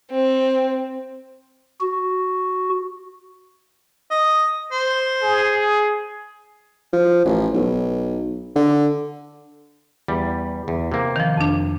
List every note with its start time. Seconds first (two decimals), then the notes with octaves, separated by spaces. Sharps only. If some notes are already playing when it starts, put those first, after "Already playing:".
0.11 C4
1.81 F#4
4.11 D#5
4.72 C5
5.23 G#4
6.93 F3
7.25 A1
7.54 B1
8.56 D3
10.08 E2 G3
10.68 E2
10.92 C3 A#3
11.16 D#3 F3
11.37 F2 D4